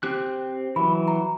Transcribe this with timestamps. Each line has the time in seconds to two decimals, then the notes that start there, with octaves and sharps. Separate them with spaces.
0.03 C4 G4 F#6
0.76 E3 F#3 B5
1.08 A#5